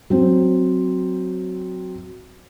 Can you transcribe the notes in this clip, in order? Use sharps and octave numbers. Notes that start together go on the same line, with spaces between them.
F#3 C4